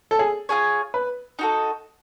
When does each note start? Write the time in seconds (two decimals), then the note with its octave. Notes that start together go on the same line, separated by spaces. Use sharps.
0.11 A4
0.19 G#4
0.49 F4 G#4 C#5
0.94 B4
1.39 D#4 F#4 A4